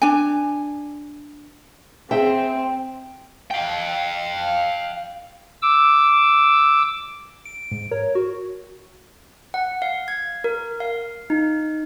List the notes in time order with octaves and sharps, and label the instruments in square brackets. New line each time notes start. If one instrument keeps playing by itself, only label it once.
[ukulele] D4 G#5
[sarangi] C4 [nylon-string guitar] G#4 E5 [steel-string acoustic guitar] G5
[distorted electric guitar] F5 G5
[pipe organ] D6 E6
[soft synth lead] D7
[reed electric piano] G#2
[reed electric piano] A#4 [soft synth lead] C#5
[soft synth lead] F#4
[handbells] F#5
F5
G#6
A#4
F5
D#4